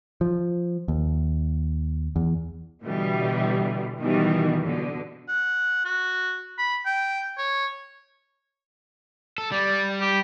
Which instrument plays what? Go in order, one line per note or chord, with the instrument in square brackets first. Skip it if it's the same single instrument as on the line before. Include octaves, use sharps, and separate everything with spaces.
[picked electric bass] F3
D#2
E2
[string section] B2 D3 E3 G3
B2 D#3 E3 G3
B2 D3
[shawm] F#5
F#4
B5
G5
C#5
[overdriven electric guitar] A4
[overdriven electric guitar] G3 [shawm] D5
[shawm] G4